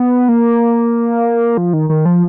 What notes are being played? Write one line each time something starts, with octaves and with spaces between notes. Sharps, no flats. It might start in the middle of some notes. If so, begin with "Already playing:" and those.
Already playing: B3
A#3
F3
D#3
D#3
F3